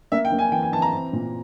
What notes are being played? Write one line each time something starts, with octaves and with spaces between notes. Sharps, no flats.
A#3 E5
G5
A#3
G#5
E3 G5
G#5
E3 A5
A#5
C4
A#2